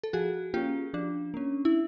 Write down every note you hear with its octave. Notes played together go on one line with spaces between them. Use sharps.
A4
F3 F#4 G#4
A#3 C#4 F4 G4
F3 D4
A#3 C#4
E4